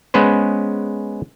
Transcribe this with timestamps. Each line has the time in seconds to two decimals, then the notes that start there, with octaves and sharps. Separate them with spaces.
0.14 G#3 B3 C#4 B4 C5